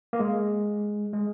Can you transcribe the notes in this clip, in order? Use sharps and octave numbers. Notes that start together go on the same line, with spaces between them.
A#3
G#3
G#3